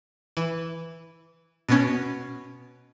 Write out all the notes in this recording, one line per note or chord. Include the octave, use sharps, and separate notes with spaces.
E3
B2 B3 C#4